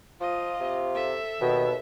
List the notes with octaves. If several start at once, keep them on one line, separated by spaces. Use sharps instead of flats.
F3 F4 D#5
C3
A4 E5
D#2 B2 D#3